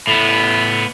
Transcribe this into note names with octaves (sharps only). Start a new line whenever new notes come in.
A2 B3